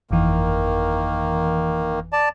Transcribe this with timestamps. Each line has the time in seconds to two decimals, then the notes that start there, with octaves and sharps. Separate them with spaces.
0.11 G1 F2 D#3 E3 A#3
2.13 D5 A5